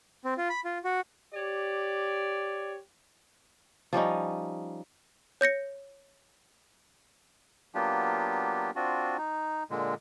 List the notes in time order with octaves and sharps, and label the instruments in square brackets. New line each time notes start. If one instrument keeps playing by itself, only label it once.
[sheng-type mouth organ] C4
F4
B5
F4
F#4
[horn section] G4 C#5 D5
[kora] F3 G3 C#4 D#4
[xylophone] C#5 G6 A#6 C#7
[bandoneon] F#3 A#3 B3 D4 F4 G4
C4 D4 F4 F#4
D#4
A#2 D3 G#3